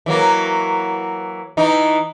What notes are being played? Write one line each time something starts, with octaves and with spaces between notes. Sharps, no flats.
E3 F#3 A#3
E3 D#4